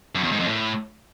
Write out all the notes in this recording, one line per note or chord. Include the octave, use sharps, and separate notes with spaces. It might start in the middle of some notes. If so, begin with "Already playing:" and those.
F#2
E2
G#2
F2
A2